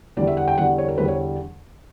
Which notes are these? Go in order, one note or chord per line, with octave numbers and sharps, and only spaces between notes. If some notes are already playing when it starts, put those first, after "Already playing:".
E2 D3 G3 D5
E5
F#5
G5
E2 D3 G3 F#5
C#5
A#4
E2 D3 G3 B4
C#5